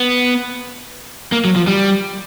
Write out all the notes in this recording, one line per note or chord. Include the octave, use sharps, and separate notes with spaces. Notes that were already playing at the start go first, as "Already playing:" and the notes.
Already playing: B3
A#3
F#3
F3
G3